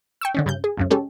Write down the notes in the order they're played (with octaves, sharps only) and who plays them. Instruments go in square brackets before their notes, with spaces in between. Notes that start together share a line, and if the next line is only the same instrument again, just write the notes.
[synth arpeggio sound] G5 C#6 E6
D3 D#3 C#4
G2 C#3 G6
G#4
C#2 F#2 C#3
G#3 C#4 G4 A4